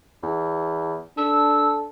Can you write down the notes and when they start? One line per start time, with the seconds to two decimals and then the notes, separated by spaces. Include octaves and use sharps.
0.23 E2
1.18 D4 A4 E6